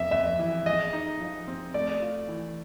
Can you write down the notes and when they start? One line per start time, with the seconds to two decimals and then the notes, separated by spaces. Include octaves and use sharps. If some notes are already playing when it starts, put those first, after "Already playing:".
Already playing: F2 C3 E5
0.11 F2 E5
0.39 E3
0.66 G#3 D#5
0.93 D#4
1.21 F3
1.47 C4
1.74 A3 D5
2.02 F4
2.29 E3